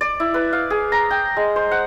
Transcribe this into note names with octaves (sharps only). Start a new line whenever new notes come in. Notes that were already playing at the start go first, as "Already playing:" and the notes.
D5
E4
B4
F5
G#4
A#5
G5
G#3
C5
F#5